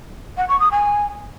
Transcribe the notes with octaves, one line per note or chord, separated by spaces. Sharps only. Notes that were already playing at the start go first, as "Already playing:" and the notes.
F#5
C#6
D#6
G#5